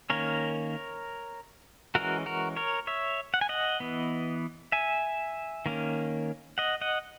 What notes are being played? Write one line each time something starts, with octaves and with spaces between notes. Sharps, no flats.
D#3 A#3 C#4 A#4 C#5
E3 G#3 C#4 F#4 A#4
F#4 A#4
A#4 C#5
C#5 E5
F#5
G#5
D#5 F#5
E3 B3
E5 G#5
D#3 A#3 C#4
D#5 F#5
D#5 F#5